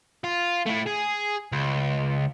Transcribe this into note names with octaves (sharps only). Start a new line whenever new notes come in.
F4
A3 E4
G#4
C#2